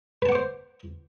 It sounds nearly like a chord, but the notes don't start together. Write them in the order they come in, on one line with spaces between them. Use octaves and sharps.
B4 A5 F#5 D6 C5